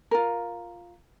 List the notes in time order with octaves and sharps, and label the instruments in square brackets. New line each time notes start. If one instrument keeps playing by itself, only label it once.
[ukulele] F4 A#4